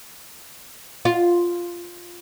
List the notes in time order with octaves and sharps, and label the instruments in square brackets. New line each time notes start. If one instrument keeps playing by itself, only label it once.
[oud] F4